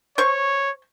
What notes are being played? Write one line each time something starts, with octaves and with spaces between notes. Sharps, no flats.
C5 C#5 C#6